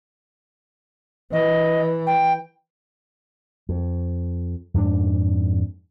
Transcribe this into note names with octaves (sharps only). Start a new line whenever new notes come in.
E3 D#5
G5
F2
F2 G#2 C#4 D4